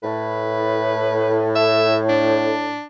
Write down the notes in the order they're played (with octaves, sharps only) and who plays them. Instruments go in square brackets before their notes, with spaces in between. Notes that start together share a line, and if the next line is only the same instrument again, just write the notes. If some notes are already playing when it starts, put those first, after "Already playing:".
[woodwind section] A2 [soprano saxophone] B4
[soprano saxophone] E5
D4